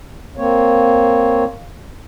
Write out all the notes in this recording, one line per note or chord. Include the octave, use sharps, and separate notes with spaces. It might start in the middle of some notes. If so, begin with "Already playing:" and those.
A#3 C4 C#5